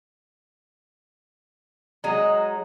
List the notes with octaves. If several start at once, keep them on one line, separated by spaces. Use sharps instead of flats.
F#3 G#3 D#4